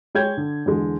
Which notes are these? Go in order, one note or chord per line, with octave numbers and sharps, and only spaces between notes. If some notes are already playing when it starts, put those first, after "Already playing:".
G#3 C#5 G5 G6 G#6
D3
E2 D3 G#3